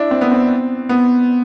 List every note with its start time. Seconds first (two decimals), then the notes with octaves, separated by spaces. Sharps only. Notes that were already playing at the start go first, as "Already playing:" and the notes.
Already playing: D4 E4
0.11 C4
0.21 B3
0.31 C4
0.89 B3